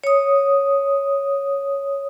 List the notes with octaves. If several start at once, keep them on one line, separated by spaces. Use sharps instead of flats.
C#5 D#6